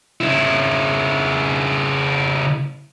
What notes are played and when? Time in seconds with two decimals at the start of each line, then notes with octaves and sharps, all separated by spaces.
0.21 C#3 E4